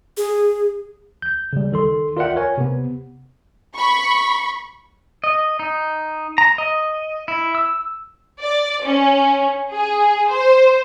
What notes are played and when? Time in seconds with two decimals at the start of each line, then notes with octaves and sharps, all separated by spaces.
0.17 G#4
1.22 G6
1.53 C#3 G3
1.72 D#3 A4 C6
2.17 F4 A#4 D5 E5 F#5 G5
2.36 A#4 C#5 G#5
2.58 C3 B3
3.75 B5 C#6
5.24 D#5
5.59 D#4
6.38 A#5
6.58 D#5
7.28 E4
7.55 E6
8.40 D5
8.83 C#4
9.71 G#4
10.29 C5